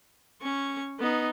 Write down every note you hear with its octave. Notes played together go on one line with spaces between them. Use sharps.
C#4 C#6
B3 D#4